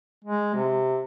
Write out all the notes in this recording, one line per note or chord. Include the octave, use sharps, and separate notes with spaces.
G#3
C3